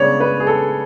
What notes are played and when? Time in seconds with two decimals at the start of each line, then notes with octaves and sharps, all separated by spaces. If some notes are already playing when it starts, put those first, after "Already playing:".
Already playing: C#3 G#3 B3 D4 C#5 D5
0.20 B4
0.40 G#4
0.47 A4